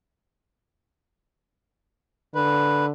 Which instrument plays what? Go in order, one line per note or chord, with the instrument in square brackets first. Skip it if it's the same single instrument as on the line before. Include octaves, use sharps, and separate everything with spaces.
[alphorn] D3 [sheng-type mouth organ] B4